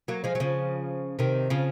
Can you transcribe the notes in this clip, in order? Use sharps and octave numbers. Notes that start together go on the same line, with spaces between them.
F#3 A#3
F3 G#3
F#3
C#3 F3
C3 D#3
C#3 F3